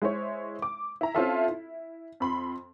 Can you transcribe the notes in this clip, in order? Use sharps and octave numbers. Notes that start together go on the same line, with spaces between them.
G#3 E4 C5 C#5
D6
E4 A#5
C4 C#4 E4 F4 A4 E5
E4
F2 B5 C6